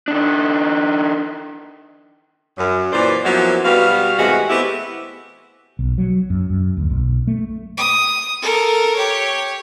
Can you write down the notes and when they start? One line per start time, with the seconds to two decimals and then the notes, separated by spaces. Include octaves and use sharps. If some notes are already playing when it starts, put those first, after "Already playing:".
0.08 D#3 D4
2.58 F#2
2.92 A#2 E3 C5 D5
3.24 F3 F#3 A#3 B3 C#4 E4
3.65 B2 G3 B3 F#4 F5
4.18 A2 C3 E3 G#3 F#4
4.49 A3 B3 C4 E4 G4
5.79 B1
5.98 F#3
6.30 F#2
6.50 F#2
6.77 D2
6.90 B1
7.27 A3
7.77 D#6
8.42 A4 A#4
8.96 G4 C#5